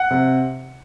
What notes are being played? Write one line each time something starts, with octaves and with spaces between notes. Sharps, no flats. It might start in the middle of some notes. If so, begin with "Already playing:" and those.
Already playing: F#5
C3